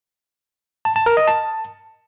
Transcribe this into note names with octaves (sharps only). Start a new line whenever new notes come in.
A5
A5
A#4
D#5
A5